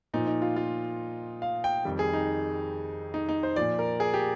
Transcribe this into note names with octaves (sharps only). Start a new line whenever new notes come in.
A#2 F3 D#4
D#4
F4
F4
F5
G5
F2 D#3 G3
G#4
D#4
D#4
D#4
C5
A#2 F3 D5
A#4
G#4
G4